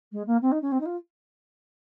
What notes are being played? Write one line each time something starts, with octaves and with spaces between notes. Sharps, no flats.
G#3
A#3
C4
D#4
C#4
C4
D#4
F4